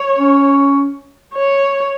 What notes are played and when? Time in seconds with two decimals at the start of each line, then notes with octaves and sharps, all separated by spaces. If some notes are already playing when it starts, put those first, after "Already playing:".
Already playing: C#5
0.18 C#4
1.34 C#5